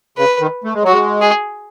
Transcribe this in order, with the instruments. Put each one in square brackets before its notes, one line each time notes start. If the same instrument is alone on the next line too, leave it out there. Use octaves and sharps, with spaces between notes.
[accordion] C#3 [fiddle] B4
[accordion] D#3
A3
G#3
[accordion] F#3 [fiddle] F#4
[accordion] G#3
[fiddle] G#4